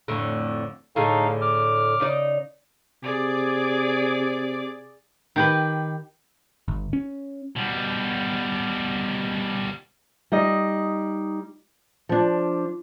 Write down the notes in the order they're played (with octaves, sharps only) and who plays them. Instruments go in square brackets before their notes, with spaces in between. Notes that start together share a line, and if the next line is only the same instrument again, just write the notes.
[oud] F2 A2 D3
[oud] A2 D3 G#4 [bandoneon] D#4 A4 F5
[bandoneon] D6 F6
[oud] C#3 D#4 D5
[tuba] C3 [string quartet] G#4 D5 D6
[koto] D#3 G4 B4
[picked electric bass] G1
C#4
[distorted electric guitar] B2 G3
[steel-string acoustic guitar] G3 D#4 D#5
F3 D4